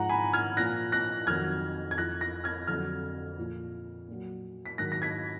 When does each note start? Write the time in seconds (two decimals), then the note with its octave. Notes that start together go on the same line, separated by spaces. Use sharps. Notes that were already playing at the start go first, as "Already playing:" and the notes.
Already playing: G#2 F3 F#5 A#5
0.09 G#5 B5
0.33 F6 G#6
0.57 A#2 F3 F#6 A#6
0.92 F#6 A#6
1.27 F2 D#3 F#3 F6 G#6
1.91 G#6
1.97 F2 F3 F#6 A#6
2.21 F#6 A#6
2.44 F6 G#6
2.67 F2 D3 F#3 F6 G#6
3.38 A#2 F3
4.08 A#2 F#3
4.66 B6
4.78 G#2 D#3 F#3 F#6 A#6
4.92 A#6
5.02 G#6 B6